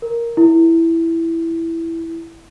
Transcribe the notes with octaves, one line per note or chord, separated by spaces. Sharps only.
A#4
E4